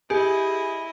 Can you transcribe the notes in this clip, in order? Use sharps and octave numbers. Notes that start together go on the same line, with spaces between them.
E4 G4 G#4 D#5